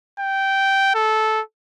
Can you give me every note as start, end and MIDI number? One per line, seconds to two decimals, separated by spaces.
0.20 0.93 79
0.95 1.41 69